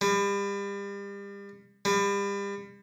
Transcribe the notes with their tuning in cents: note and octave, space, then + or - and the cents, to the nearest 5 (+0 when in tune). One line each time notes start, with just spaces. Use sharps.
G3 +35
G3 +35